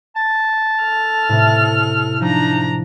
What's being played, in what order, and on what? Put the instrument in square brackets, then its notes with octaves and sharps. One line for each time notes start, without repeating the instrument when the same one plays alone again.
[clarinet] A5
[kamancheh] A4 F6
[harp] A2 C3
[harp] F3 [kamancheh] D4 A#5 [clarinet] D#4